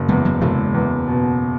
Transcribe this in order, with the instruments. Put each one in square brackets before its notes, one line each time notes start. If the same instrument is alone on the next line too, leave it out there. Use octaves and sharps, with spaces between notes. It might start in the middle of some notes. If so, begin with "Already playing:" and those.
Already playing: [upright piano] F#1
[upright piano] E2 [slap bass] G#3 B3
[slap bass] F#3 A#3
[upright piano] F#1 [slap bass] E3 G#3
[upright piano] E2
B2